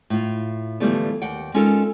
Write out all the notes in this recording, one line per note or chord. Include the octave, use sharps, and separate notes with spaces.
A2 F4
D3 E3 F3 G3 A3 B3
D#2 F#5 G5
G#3 C#4 D#4 F4 A4 A#4